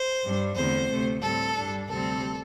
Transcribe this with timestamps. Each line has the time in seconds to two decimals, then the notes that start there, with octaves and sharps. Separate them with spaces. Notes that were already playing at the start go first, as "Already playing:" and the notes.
Already playing: C5
0.23 G2 G3 D4
0.56 E2 D3 A3 C4 C5
0.89 D2 C3 A3
1.22 A2 G3 C4 A4
1.56 G2 G3 D4
1.89 D2 C3 G3 C4 A4